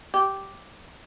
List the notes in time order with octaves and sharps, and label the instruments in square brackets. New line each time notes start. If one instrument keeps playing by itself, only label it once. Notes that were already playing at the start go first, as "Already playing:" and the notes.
[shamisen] G4